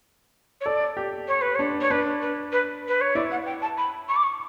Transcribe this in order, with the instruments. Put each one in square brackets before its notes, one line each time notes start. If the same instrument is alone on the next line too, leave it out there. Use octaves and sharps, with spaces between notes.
[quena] C#5
[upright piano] A4 [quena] D5
[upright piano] G4
[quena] C#5
B4
[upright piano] D4 [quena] C#5
[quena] C#5
[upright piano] D4 [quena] B4
[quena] B4
B4
B4
C#5
[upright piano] E4 [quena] D5
[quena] F#5
G5
A5
B5
C#6
D6
C#6